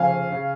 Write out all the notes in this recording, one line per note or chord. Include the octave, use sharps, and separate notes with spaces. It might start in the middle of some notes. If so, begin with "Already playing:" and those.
Already playing: F1 F2 C#3 F5 G#5
C#3